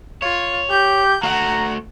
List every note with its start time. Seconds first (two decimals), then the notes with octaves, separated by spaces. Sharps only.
0.22 F4 C#5
0.70 G4 G6
1.23 A3 F#4 F#5 A#5